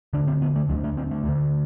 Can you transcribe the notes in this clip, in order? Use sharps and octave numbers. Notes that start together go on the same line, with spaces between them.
D2 D3 D4
C4
B3
A3
D2 D3 F#3
A3
C4
A3
D2 D3